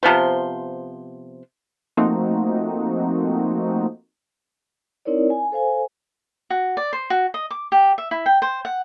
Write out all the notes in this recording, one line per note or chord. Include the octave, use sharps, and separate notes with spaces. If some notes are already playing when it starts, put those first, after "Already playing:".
C3 F3 B3 C5
F3 A3 A#3 C4 D#4 F#4
C4 D#4 E4 A#4 C#5 D5
G#5
A4 C5 F5 G#5
F#4
D5
C5
F#4
D#5
D6
G4
E5
E4
G5
C5
F#5